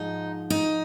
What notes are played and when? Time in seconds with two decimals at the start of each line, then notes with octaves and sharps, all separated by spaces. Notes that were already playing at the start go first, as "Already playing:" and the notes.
Already playing: G#2 F3 G#3 D#4
0.50 D#4